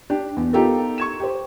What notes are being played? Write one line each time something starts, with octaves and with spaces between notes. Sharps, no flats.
D4 G4
E2
B3 D#4 F4 G4 A4 A#4
C#6 G#6 E7
G4 C5